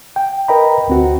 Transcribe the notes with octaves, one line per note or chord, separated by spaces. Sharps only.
G5
A#4 B4 D#5 G5 A#5 B5
D2 C4 F#4